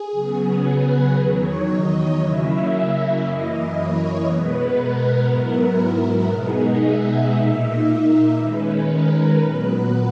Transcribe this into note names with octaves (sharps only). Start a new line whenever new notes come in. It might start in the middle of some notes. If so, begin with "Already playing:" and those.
Already playing: G#4
C#3 F#3 B3
B4
E2 D#3 F#3 C#5
D#5
C#3 F#3 A#3 C#4 E4 E5
F#2 E3 A#3 E4 D#5
C#5
B2 G#3 B3 B4
A#4
G#2 F#3 B3 E4
B2 G#3 B3 D#4 G#4
E5
A#2 A#3 D#4 E5
D#3 G#3 C#4 B4
A#4
A#2 F#3 B3 B4